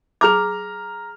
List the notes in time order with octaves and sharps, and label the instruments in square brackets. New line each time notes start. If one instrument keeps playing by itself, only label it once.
[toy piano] G#4 D6 [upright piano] A#5 F6 F7